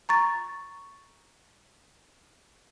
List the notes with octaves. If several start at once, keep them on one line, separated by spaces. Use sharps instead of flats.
A#5 C#6 A6